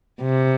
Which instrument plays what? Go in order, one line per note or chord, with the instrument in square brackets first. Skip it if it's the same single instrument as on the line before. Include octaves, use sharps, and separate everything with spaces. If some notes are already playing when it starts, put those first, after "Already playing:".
[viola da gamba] C3